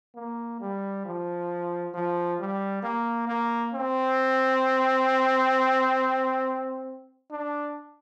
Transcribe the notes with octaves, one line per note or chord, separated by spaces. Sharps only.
A#3
G3
F3
F3
G3
A#3
A#3
C4
D4